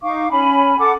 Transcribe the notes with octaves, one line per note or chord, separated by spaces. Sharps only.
D#4 F5 C#6 D6
C#4 G#5 B5
A4 F#5 D6